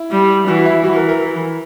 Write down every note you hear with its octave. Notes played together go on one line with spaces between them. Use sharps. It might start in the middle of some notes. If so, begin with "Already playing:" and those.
Already playing: E4
G3
E3 F#4
E4
E3 F#4
A#4
A#4